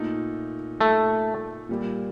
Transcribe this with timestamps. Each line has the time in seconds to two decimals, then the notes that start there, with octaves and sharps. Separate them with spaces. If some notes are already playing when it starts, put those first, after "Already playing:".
Already playing: A#2 A3 D#4
0.81 A3
1.69 A#2 G3 A#3